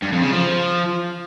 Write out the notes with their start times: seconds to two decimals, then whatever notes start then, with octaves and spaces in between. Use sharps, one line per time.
0.03 G2
0.13 F2
0.23 C#3
0.33 F3